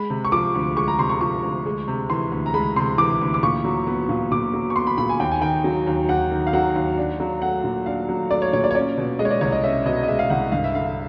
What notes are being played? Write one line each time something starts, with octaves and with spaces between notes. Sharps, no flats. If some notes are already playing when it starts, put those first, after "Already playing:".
Already playing: G#3 B5
C3
C#6
F3 D6
D2
G#3 C#6
A#5
C3 C6
C#6
F3 C#6
D2
G#3
C3
E3 C6
D2
A#5
G#3 B5
C3 C6
E3 D6
D2
D6
A#2 C#6
F#3
B3
A#2
A#2 D6
F#3
C#6
B3 C6
B5
A#2 B5
G#5
D#2 G5
G#5
D#3 G5
F#3
D#2
D#2 F#5
D#3
F5
F#3 F#5
D#2
D4
F#3
A3 F#5
A#2
D4 F5
F#3
A3 D5
C#5
A#2 C#5
D5
C#5
C#4 D5
B2
G#3 D#5
C#5
D5
C2 C#5
D#5
C#4 E5
B2 D#5
D#5
G#3 E5
F5
C2 F#5
G2 F5
E5
D3 F5